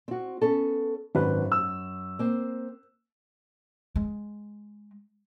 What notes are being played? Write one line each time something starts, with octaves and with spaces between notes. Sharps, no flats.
C4 F#4
B3 C#4 A4
G#1 F#2 B4
E6
A#3 C4
G#3